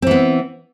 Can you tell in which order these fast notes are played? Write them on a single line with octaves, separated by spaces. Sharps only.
C4 E3 B3